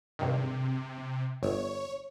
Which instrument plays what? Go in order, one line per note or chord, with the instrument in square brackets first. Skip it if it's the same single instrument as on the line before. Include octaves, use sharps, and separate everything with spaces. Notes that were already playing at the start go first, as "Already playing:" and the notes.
[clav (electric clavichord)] G#1 G2 D#3 [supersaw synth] C3
[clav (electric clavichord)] G1 [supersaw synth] C#5